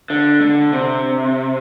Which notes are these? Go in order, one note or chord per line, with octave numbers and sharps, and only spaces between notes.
D3
D3
C3